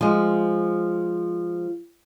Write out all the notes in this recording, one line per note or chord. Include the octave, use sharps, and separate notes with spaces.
F3 G#3